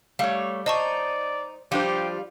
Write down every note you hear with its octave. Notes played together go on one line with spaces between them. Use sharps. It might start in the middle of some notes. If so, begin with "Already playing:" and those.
G3 A3 C#5 F5
D#4 C5 D5 D#5 A5 C#6
F3 G3 D4 F4 G4 C5